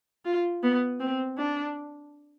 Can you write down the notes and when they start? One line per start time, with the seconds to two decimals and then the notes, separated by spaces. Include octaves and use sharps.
0.25 F4
0.63 B3
1.00 C4
1.38 D4